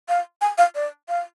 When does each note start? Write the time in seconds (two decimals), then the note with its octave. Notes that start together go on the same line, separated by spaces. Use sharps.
0.09 F5
0.41 G#5
0.58 F5
0.75 D5
1.09 F5